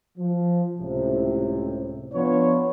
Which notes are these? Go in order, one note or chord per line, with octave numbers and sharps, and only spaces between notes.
F3
C#2 A2 C3
F3 B3 D4 F4 B4 C#5